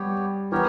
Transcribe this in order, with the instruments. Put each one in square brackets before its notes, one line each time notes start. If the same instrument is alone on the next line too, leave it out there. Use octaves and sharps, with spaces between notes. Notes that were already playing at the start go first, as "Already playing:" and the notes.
Already playing: [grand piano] G3 [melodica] B3 G4 C#5
[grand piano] E3 [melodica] B3 G4 A#4 C#5